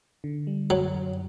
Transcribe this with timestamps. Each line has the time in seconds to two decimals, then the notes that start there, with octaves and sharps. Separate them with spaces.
0.24 D3
0.47 G3
0.70 F#2 F#3
0.95 F#2